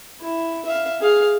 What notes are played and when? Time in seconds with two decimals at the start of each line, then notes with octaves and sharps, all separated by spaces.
0.21 E4
0.65 E5 F5
1.00 G#4 F5